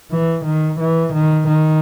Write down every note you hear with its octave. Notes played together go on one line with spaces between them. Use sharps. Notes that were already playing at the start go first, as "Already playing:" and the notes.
E3
D#3
E3
D#3
D#3